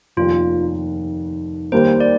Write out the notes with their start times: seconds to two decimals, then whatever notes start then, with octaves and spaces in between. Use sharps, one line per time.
0.17 F1 D#2 D#3 F4
1.72 D#2 D#3 G3 A#3 C5
2.00 D5